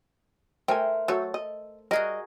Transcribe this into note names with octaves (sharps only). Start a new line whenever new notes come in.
A3 A#4 C5 G5 G#5
F#3 A3 A4 C#5
D#5
G3 F#4 G#4 A#4 D#5